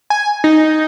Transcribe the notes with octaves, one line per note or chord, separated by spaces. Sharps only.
G#5
D#4